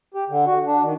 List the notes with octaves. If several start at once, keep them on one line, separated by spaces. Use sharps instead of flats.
G4
D3
F#4
D4
D#3